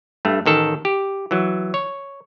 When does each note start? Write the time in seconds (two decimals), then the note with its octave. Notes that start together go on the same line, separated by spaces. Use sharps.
0.25 G2 A3
0.46 A1 D#3 A4
0.85 G4
1.31 E3 F#3
1.74 C#5